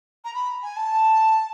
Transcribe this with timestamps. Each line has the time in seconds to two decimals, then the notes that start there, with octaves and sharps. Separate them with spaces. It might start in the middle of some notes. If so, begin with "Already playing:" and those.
0.25 A#5
0.34 B5
0.63 G#5
0.76 A5